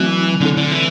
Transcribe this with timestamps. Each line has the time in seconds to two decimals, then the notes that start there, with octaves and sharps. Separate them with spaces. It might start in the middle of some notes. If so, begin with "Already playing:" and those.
Already playing: E3 F#3 A3 C4 F#4
0.41 D3 A3 C4 E4 A4
0.57 D3
0.71 E3